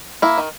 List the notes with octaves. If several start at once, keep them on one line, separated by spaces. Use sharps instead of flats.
A#3 E4
D#3